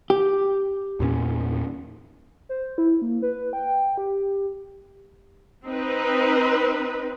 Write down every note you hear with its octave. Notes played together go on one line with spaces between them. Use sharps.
G4
E2 A#2 C#4
C5
E4
A#3
B4
G5
G4
C4 D#4 B4